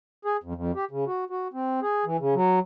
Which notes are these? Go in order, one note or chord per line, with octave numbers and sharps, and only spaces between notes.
G#4
F2
F2
G4
C#3
F#4
F#4
C4
G#4
E3
C#3
F#3